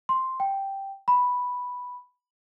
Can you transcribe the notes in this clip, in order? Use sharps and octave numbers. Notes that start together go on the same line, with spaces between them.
C6
G5
B5